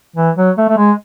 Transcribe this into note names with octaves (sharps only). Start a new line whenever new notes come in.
E3
F#3
A3
A3
G#3